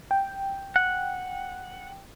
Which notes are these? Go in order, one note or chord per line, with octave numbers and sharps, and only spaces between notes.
G5
F#5